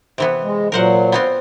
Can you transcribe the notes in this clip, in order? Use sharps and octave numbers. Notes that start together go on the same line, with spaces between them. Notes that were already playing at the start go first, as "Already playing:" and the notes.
C3 E3 B3
G#3
A#2 F#3 A#4 C5 F#5
B3 C4 F4